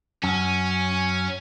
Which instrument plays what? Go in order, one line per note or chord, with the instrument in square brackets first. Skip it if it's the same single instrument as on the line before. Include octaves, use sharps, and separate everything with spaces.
[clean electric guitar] F#2 [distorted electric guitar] C#4